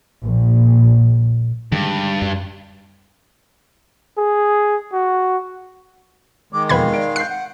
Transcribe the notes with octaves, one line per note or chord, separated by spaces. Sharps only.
A#1
G2 D3 D#3 G#3
F#2
G#4
F#4
D#3 G#3 D6
E1 F2 B4 F5 G5 B5 G#6
D5 D7
F#6 G6 C7
F#5